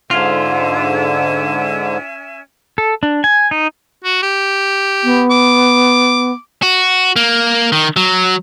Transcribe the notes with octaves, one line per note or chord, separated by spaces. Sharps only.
G#2 D3 C#4 F4 E5 G#5
A4
D4
G#5
D#4
F#4
G4
B3
D6
F#4
A#3
D#3
F#3